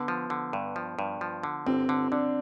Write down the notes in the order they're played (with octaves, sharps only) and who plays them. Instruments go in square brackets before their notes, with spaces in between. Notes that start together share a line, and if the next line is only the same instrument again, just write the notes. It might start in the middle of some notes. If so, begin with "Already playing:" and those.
Already playing: [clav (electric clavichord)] D3 [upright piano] B3
[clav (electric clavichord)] F3
D3
G2
F3
G2
F3
D3
[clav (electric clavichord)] G1 [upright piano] C4
[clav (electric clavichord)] D3
[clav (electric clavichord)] D3 [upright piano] D4